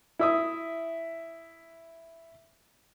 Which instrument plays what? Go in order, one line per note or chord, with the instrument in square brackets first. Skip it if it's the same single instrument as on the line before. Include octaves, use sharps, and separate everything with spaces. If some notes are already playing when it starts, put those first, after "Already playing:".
[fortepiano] E4 E5 D#6